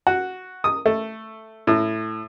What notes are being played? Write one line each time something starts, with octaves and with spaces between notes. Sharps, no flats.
F#4
D#6
A3
A2